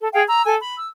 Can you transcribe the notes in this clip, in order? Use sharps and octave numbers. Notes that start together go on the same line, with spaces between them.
A4
G#4 F5 G5
A#5 E6
A4 G#5
B5
E6